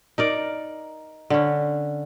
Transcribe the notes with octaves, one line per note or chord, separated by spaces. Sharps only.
D#4 A#4 D5
D3 C#4